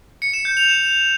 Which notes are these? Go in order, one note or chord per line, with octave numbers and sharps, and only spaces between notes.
C#7
E7
G6
F7
E7